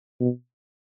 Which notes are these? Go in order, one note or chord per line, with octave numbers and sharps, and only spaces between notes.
B2